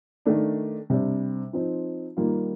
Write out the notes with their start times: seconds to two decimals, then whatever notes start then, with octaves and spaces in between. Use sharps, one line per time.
0.26 D#3 A3 D4
0.90 C3 G3 D4
1.53 F3 C4 D#4
2.17 D#3 G3 A#3 F4